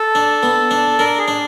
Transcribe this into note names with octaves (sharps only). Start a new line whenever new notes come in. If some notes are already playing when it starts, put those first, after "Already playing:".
Already playing: A4
D4
B3
D4
D4 A#4
G#4
D4